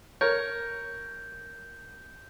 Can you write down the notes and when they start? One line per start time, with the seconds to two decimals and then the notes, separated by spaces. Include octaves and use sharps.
0.21 A#4 C#5 G6